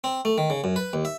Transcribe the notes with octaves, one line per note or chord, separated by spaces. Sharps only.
C4
A3
D#3
C#3
F#2
B4
D#2
E5